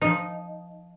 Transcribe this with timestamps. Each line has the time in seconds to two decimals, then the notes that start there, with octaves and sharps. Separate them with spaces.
0.01 F3 D#4